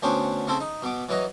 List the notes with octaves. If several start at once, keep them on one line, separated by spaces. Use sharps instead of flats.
D2 B3 C#4 D4 C5 G5
C#3 C4 E4 A4 C5
D#4
B2 B3 D6
E3 F#3 B4 D#5 A#5